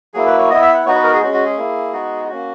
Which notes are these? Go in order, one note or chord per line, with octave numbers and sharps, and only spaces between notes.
F#3 A#3 E4 G#4
B4
C#5
B3 E4 D#5
E5
F#5
B3 D#4 F#4 C#5
B4
A#4
G#4
G#3 C#4 F#4
F#4
G#4
A#3 E4
G#3 B3 D#4 F#4
A#3 C#4 F#4